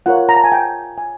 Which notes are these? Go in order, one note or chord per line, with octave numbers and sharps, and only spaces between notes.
F4 A#4 C#5 F#5
A#5
A5
G#5
G5
G#5